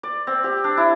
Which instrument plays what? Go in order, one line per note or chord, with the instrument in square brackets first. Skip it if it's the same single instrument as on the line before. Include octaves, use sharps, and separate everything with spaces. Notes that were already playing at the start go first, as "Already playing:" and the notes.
[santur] D5
C4
G4
D4
E4